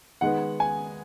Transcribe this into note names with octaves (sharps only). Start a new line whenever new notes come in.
D#3 G#3 B3 F#5
G#5